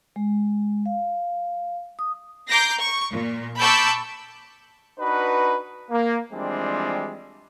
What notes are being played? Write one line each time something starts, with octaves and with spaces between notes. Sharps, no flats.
G#3
F5
D#6
A#5 D6 G6 A#6 C7
C#6
A#2
A5 B5 C#6 D6 E6 G6
D4 D#4 F#4 B4
A#3
E3 F3 G3 G#3 C4 D4